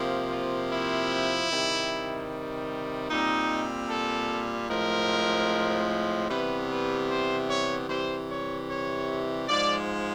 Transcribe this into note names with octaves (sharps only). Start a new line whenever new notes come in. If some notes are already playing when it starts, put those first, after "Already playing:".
Already playing: C3 F3 A#3
F4
E4
C3 D#3 G3
A#2 G3 C4 D#4
A4
A2 F3 G#3 C4 A#4
C3 E3 G3 B3 B4
B4
C5
C#5
C3 E3 G3 C5
C#5
C#5
G#2 F3 G#3 D5